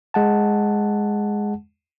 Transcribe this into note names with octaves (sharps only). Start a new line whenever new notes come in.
G#3 F#5 A5